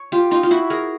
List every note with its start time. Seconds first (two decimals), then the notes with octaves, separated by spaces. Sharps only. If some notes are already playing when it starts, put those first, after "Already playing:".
Already playing: C#5
0.12 F4 G4
0.31 D#4 F4
0.43 F4
0.51 E4 F#4
0.70 G#4 A#4